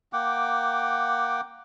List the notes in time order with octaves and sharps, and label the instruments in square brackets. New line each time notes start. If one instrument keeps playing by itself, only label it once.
[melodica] A#3 F#5 G5 D6